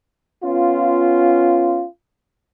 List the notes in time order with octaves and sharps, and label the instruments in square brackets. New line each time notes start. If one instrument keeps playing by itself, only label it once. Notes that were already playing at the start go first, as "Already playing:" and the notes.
[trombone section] B3 C#4 F4